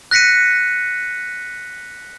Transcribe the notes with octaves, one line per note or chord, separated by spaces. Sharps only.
F#6 A#6 B6 C#7 D#7